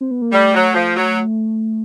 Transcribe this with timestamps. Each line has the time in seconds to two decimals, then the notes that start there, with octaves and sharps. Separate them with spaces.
0.01 C4
0.11 B3
0.22 A#3
0.32 G3 A3
0.54 F#3
0.74 F3
0.96 F#3